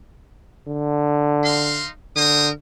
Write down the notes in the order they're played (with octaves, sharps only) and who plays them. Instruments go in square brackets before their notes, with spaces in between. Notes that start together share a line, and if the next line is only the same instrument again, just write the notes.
[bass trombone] D3
[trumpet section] D#4 F5 C6
[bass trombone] D3 [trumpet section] A#4 C5 D#6